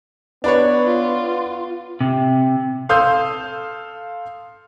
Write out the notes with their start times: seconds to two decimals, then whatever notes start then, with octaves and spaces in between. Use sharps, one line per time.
0.44 B3 D4 B4 C#5
0.84 F4
2.01 C3
2.89 A4 F5 C6 D#6 E6 G6